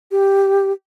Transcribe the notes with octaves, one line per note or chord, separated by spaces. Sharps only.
G4